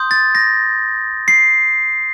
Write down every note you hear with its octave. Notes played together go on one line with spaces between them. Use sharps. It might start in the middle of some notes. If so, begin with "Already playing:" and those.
Already playing: C6 D#6 G6
A6
A#6
C7